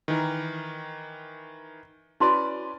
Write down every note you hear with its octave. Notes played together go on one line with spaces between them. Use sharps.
D#3 E3 A#4
C#4 E4 F#4 B4 D5 C6